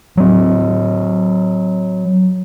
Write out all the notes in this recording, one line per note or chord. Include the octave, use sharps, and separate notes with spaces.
F#3 C4